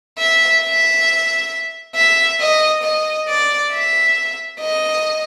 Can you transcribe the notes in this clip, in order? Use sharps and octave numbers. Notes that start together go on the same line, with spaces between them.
E5
E5
E5
D#5
D#5
D5
E5
D#5